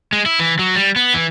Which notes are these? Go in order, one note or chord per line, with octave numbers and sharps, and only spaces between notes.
G#3
E4
E3
F#3
G3
B3
E3